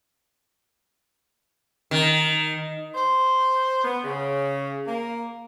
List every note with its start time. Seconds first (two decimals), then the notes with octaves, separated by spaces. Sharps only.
1.91 D#3
2.95 C5
3.84 B3
4.05 C#3
4.86 A#3